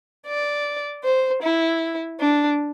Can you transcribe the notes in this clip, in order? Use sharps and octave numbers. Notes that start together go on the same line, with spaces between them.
D5
C5
E4
D4